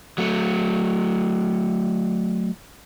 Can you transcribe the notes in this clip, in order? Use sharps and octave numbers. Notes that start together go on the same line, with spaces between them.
F#3 A3